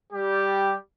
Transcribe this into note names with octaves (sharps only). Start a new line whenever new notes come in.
G3 G4